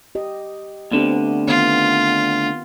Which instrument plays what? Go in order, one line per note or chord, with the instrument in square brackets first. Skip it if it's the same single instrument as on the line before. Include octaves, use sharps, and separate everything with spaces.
[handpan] G4 D#5
[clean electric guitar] D2 D3 [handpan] B3 C4 G4
[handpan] D#3 B3 [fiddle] F4